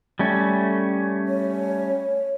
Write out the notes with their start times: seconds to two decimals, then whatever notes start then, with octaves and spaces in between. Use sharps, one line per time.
0.19 G3 A3 C#4
1.28 C#5